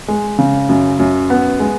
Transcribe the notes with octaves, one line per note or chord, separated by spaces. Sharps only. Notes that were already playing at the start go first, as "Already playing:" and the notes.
G#3
C#3
F#2
F#2
B3
G#3